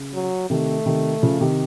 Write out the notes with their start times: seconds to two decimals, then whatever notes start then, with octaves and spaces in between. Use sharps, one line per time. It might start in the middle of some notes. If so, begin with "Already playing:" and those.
Already playing: C#3
0.14 F#3
0.50 C3 D#3 A3
0.86 C3 D#3
1.22 C#3 F3
1.41 C3 D#3